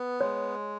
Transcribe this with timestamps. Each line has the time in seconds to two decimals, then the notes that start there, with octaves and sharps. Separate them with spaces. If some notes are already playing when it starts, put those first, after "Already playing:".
Already playing: B3
0.20 G#3 C#5